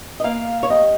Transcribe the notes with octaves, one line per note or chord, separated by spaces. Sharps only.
D#5
A#3 F5
C#5
G3 D#5